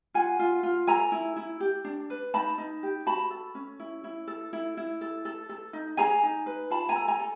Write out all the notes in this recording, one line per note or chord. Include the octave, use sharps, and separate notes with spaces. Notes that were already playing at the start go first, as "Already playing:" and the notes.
F4 F#5 G#5
F4
F4
A4 G#5 A#5
E4
E4
G4
D4
B4
D#4 A5 B5
D#4
G4
F#4 A5 B5
A4
C#4
E4
E4
A4
E4
E4
A4
A4
A4
D#4
G#4 G#5 A#5
D#4
B4
F4 A5 B5
G#5 A#5
A4
G#5 A#5
A4